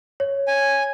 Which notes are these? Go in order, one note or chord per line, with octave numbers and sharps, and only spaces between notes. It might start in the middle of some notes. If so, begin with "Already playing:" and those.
C#5
G#5